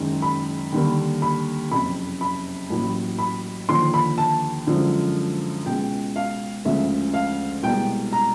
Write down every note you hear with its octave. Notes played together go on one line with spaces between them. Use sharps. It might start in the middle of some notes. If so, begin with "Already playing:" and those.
Already playing: F#1 F#2 D#3 G#3
B5
D#2 D3 G3 A#3
B5
F#1 F2 C3 B5
B5
A1 A2 F#3 A#3
B5
D#2 D3 F3 C6
B5
A5
F#2 D3 F3 G#3
C#2 B2 G#3 G5
F5
D2 C#3 F3 G#3 E5
F5
C2 B2 G#3 G5
A#5